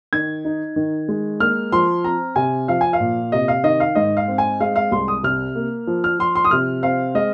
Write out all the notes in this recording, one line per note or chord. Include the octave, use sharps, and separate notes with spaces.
D#3 G#6
D#4
D#3
G#3
A#3 F6
F3 C6
C4 A#5
C3 G#5
F3 F5
G#5
F5
A#2
C3 D#5
F5
D#3 D#5
F5
G#2 D#5
F5
C4
G#5
G#3 F5
F5
C2 C6
D#6
C3 F6
A#3
F3
F6
F3 C6
C6
D#6
C3 F6
C4 F5
G#3 D#5